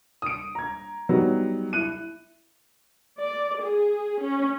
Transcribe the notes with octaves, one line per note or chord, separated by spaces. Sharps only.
D#6 D7
A#5 G#6
F#3 G3 B3 D#4
E4 F#6 D#7
D5
G#4
C#4